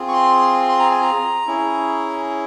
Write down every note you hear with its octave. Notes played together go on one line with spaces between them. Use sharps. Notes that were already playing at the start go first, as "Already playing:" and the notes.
Already playing: C4 F4 G#4
C#6
C6
C6
A#5
G#5
A#5
C#4 E4 G#4